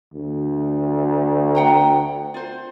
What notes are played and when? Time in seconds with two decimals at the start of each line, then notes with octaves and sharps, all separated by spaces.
0.13 D2
1.55 F#5 G5 A#5
2.34 F4 C5